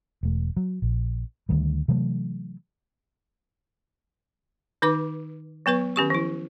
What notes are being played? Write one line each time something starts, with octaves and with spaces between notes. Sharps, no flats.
E1 A3
F#3
A#1
D2 D#3 G3
C3 E3 F#3 A3
D#3 D#4 B4 D6
F#3 B3 B4 C#6
D#3 C#4 G4 C#6
F3 E4